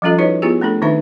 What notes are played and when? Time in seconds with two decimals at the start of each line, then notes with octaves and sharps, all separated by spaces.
0.02 F3 G3 C#4 F4 A4 D#5
0.18 D#4 E4 F#4 B4 C#5 D#5
0.42 B3 E4 F4 G4 G#4
0.61 A3 C4 D4 A4
0.82 D#3 C4 D4 D#4 B4 E5